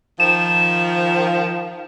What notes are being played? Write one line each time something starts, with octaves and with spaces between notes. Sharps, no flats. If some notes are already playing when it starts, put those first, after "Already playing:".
D#3 F3 E7